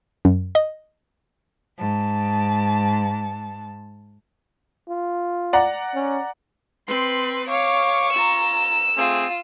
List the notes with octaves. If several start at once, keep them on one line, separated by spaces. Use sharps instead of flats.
F#2
D#5
G#2 A5
F4
D5 F#5 A#5
C#4
C4 B4 C6
C#5 F5 C#6 D6
F4 A#5 E6
A3 C4 F4 G#4